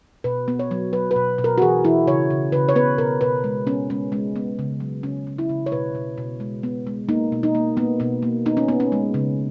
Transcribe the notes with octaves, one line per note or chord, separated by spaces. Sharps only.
B2 B4
B3
C#5
F#3
F#3 B4
B4
B2
B2
A#4
F#4
E3 G#4
E3 E4
C#3 C#5
C#3
C#3 B4
C#5
B3 B4
B2 A#4
B2 B4
G#3
B3 C#4
G#3 C#4
G#3 C#4
B3
C#3
F#3
C#3 C#4
C#3
E4
C#3
C#5
B2 B4
B2
B2
G#3
B3
G#3
A#3 D#4
B2
D#4
A#3
A#3 B3
B2 B3
A#3
B3 D#4
C#4
B3
C#4
G#3
C#3